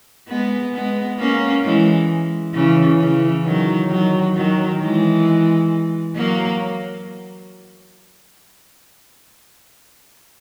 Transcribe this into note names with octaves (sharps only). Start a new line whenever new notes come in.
G#3 B3
G#3 B3
A#3 C#4
E3 G#3
C#3 E3
C#3 E3
D#3 F#3
D#3 F#3
D#3 F#3
E3 G#3
F#3 A#3